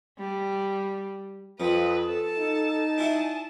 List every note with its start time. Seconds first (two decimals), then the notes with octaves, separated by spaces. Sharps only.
0.19 G3
1.60 F2 F3 B4 D#6
2.08 A4 A5
2.38 D#4
2.98 D4 E4 F#4 G#5